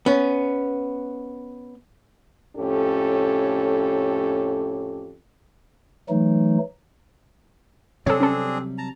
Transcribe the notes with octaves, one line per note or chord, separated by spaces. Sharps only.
B3 C#4
F2 A2 C#4 G4 A4
E3 F#3 A3 D#4
C3 F#3 G3 C4 D4 G#4 A4 C#5
C#4 A4
A5 A#5